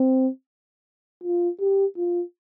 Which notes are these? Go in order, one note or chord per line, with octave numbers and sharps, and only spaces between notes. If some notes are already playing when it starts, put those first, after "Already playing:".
Already playing: C4
F4
G4
F4